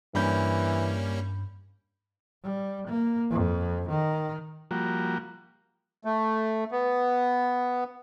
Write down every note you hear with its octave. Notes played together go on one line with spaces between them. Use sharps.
G2 E3 G3 A#3 C#4 B5 G6
G3
A#3
F2
D#3
F3 G3 A#3 F#4
A3
B3